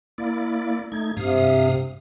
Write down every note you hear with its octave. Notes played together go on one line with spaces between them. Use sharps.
A#3 E4 D5
A3 D#4 G#6
G2 C3 F5 D#6